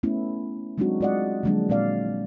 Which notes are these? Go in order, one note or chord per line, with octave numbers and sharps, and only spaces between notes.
A3 B3 C#4 E4
F#3 G#3 C4 D4 D#4 F#4
G#3 F4 D5 D#5 F#5
D3 F3 F#3 G#3 A#3 D4
A#2 G#3 C4 D5 F5